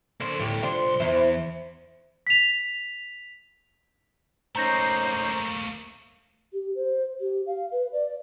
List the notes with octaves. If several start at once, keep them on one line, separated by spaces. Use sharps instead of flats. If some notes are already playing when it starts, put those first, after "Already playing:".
D3 A#3 C5
D2 A2 G4
C2 C4 D4 F4 C6
E2 E4 C5
B6 F7
A3 A#3 C#4 D#4 C5 A#5 G6 A#6
G4
C5
G4
F5
B4
D5